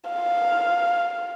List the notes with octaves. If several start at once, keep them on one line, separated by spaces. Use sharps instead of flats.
F5